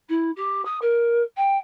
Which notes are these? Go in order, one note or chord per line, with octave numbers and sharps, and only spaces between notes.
E4
G4
D#6
A#4
G5